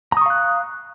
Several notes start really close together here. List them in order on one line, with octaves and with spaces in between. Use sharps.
A#5 D#6 C#6 F5 F#6